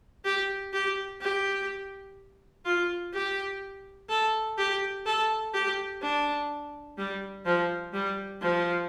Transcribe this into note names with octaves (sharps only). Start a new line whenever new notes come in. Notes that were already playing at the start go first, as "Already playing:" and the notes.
G4
G4
G4
F4
G4
A4
G4
A4
G4
D4
G3
F3
G3
F3